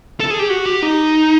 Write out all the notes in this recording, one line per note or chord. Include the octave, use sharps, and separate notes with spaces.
A4
G#4
G4
F#4
G4
D#4